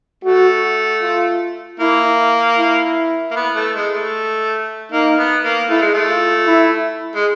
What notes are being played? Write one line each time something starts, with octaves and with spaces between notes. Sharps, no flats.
A3 F#4
F4
A#3 E4
E4
A#3
B3
A3
G#3
A3
A#3 D#4
B3
A#3
A3 E4
G#3
A3
F4
E4
G#3